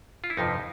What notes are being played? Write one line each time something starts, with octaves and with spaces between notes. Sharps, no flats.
F4
E4
G1 F2 C3 F3 D#4